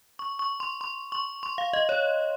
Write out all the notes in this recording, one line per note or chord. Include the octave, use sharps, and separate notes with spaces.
C#6
C#6
C6
C6
C#6
C6
F5
D#5
C#5